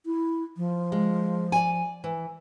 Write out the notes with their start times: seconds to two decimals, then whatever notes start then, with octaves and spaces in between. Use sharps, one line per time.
0.06 E4
0.57 F3
0.92 G#3
1.52 D5 G#5
2.04 E3